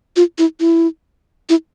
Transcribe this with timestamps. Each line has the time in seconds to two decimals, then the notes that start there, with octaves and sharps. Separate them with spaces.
0.16 F4
0.38 E4
0.60 E4
1.49 E4